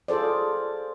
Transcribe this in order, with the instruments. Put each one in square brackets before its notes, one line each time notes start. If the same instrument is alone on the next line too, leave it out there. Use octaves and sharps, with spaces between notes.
[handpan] F4 G#4 A4 C5 D5